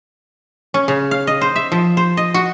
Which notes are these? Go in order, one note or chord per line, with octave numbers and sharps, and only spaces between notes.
C#4
C#3
F5
D#5
C5
E5
F3
C5
D#5
F#4